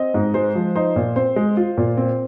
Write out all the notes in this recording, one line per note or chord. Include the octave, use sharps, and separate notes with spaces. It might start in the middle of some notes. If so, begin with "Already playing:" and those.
Already playing: C4 D#5
G#2
G#3 C5
F3
D#4 C5
A#2
C4 C5
G#3
F4
A#2
C4